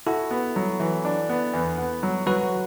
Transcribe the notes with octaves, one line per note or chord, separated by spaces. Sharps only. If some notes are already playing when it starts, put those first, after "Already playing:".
E4 F#4 A4
B3
F#3
E3
D4
B3
E2
B3
F#3
F#3 F#4 B4